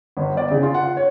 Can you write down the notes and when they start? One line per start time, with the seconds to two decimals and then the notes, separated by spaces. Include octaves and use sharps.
0.17 G1
0.37 D5
0.51 C#3
0.63 F4
0.74 F#5
0.97 C#5